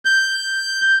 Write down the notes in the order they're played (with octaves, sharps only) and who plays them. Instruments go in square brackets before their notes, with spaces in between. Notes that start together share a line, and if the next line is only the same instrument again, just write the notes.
[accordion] G6